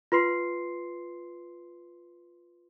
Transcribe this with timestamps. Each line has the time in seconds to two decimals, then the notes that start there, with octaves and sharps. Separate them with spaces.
0.12 F4 B4 C6 C7